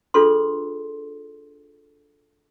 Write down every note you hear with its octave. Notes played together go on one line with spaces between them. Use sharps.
D4 F4 G#4 A4 B4 C6